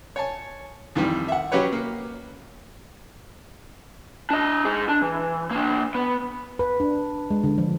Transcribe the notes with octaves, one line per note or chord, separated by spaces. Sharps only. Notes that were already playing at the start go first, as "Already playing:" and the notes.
C#5 G#5 A5
F2 D#3 E3 G3
E5 F#5
F#3 C#4 G4 B4 C#5
A#3
D4 D#5
D#4 G#4
D4
E3
A#3 D4
B3
B4
D4
G#3
D3
F3